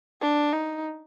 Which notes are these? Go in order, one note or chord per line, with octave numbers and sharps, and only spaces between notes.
D4
D#4